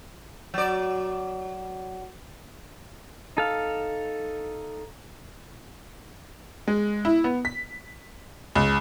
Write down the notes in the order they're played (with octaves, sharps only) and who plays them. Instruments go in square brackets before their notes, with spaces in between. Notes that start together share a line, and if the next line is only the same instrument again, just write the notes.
[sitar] F#3 D5
[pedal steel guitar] D#4 A4 F5
[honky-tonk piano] G#3
E4
B3
B6
C#2